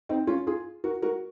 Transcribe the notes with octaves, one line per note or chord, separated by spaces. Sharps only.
C4 D#4
C#4 F4
F4 G#4
F#4 A#4
F#4 A#4